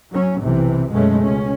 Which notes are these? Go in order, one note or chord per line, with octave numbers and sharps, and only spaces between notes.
F#3 C#4
B1 C3 E3
F#2 B2 G#3 A3 C#4
C#2 C#4